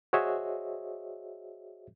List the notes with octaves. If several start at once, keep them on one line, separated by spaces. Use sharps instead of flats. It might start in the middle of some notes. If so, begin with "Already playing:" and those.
F#4 G#4 C5 C#5 D#5 E5